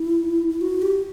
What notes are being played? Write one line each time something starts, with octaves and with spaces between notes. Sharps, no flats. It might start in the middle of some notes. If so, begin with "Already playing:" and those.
Already playing: E4
E4
F#4
G4